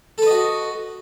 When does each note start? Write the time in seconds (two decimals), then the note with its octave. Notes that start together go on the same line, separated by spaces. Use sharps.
0.18 A4
0.22 B4
0.26 D#5
0.31 F#4